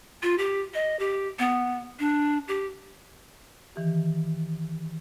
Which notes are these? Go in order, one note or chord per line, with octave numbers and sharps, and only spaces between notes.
F4
G4
D#5
G4
B3
D4
G4
D#3 E3 G4